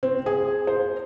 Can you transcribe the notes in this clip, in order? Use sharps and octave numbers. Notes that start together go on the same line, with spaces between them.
C4
G#4
C5